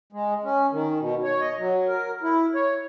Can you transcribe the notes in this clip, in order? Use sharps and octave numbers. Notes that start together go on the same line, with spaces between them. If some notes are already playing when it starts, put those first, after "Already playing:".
G#3
C#4
D#3
B2
C#5
D#5
F#3
A#4
E4
C#5